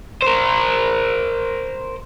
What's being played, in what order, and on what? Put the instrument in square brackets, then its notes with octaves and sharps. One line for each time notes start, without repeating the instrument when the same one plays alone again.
[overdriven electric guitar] A#4 C5